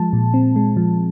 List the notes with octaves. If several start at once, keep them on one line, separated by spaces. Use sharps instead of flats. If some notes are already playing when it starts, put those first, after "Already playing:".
Already playing: F3 G#3 A5
A#2
C4
G#3
F3